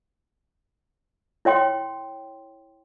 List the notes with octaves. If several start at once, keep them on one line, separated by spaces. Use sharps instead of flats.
E4 C#5 G5 C6